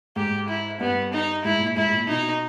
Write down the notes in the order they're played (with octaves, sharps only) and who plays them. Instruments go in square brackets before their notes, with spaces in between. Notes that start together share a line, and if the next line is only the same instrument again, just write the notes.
[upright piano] G#2 [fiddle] G4
[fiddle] E4
[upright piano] G2 [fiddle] B3
[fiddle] D#4
[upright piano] G#2 [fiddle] E4
[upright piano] A#2
[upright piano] G#2 [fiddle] E4
[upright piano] A#2
[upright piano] B2 [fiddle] D#4